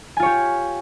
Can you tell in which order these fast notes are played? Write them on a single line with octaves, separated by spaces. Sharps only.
G#5 F4 C#5 G4